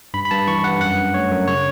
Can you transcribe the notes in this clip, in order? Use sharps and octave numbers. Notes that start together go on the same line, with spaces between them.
G2 B5
B5
G2 A5
E3 C#6
G2 F#5
F#2 F#5
D4
A3 C#5
F#2
C#3 C#5